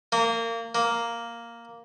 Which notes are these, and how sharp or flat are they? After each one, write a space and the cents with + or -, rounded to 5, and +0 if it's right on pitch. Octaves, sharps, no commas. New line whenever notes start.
A#3 -25
A#3 +0